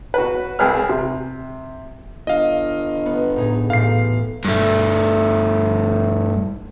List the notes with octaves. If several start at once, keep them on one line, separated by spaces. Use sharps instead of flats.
F#4 B4
C2 G#4 B4 F6
C3
G1 D#5 F5
B3
A2 D#4 G#4
A1 A2 F5 C7
G2 A3